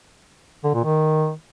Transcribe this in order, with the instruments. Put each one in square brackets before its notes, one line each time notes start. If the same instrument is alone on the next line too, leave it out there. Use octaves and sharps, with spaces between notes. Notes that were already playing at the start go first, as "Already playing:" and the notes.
[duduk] D3
A#2
D#3